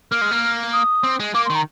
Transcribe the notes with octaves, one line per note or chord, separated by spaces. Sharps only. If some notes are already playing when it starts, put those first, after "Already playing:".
A#3 F6
G#3
A#3
D#6
C4
G#3
A#3 D6
C6
D#3
A#5